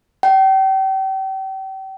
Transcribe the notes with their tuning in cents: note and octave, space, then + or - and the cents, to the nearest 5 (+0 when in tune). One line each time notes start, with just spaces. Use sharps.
G5 -35